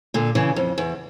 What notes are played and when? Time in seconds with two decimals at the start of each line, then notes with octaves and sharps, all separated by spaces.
0.14 A#2 D3
0.35 C#3 E3
0.56 F2
0.78 E2